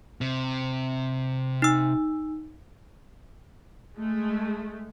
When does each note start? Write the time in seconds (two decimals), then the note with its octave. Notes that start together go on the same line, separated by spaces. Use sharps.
0.21 C3
1.62 D#4 E6
3.97 G#3 A3